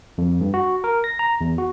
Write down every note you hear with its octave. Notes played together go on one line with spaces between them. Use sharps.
F2
G2
F#4
A#4
A#6
A#5
E2
F#4